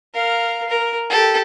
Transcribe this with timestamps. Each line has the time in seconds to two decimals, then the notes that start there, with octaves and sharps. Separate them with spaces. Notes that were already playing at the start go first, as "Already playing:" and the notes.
0.14 A#4 F5
0.69 A#4
1.10 G4 A4